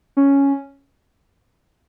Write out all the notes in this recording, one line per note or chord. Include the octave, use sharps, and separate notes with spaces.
C#4